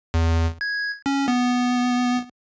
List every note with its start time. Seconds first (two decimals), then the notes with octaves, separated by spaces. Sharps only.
0.14 E2
0.61 G#6
1.06 C#4
1.28 B3